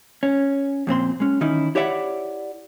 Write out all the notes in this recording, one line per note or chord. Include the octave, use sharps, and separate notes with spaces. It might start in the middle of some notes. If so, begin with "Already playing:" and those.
C#4
F2 A#2 C4 C6
G#3 C#4
D#3 E3 C#4 D#4 E4
E4 G4 C#5 D5 E5 F#5